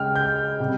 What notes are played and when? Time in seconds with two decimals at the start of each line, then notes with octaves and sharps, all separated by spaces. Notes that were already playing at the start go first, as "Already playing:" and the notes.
Already playing: C#3 G#3 G5 F6
0.15 G6
0.60 C3 G3